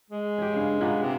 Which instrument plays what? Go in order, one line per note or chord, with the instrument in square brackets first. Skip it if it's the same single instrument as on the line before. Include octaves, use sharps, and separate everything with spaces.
[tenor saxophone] G#3
[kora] C#4 G4
G2 C#3 F5
A#2 A#3 B3
[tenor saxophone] C3